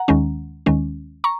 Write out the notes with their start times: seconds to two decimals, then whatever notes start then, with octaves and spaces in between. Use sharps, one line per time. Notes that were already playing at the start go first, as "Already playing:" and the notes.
Already playing: F#5 A#5
0.08 D#2 D#3 G#3 C#4
0.66 D#2 D#3 G#3 C#4
1.24 A#5 C#6